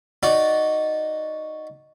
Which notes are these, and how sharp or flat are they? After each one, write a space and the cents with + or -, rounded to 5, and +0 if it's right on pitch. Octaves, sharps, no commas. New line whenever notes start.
D#4 -5 F#4 +0 D5 -10